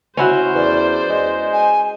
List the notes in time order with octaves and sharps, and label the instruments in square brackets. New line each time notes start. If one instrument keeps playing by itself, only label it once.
[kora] C#4 E4 F#4 [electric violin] C5
[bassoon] E2 [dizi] D5
[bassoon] G#3
[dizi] G#5